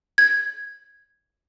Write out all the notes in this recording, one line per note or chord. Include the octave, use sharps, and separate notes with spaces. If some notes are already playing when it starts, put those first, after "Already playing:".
G#6